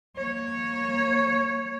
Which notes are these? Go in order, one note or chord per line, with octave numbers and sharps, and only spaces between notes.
A#3 C#5